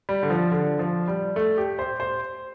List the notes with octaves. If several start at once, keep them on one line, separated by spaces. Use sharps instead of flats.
G3
D3
F3
D3
F3
G3
A3
G4
C5
C5